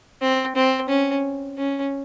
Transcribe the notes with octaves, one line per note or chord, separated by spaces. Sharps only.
C4
C4
C#4
C#4